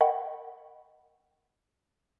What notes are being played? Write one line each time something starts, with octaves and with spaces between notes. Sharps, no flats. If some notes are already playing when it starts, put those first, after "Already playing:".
A#4 D#5 F#5 G5 B5 C#6